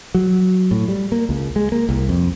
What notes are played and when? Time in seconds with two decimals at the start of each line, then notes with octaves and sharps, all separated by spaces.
0.15 F#3
0.71 A2
0.88 G3
1.12 A#3
1.29 C#2
1.56 G#3
1.72 A#3
1.89 C2
2.09 F2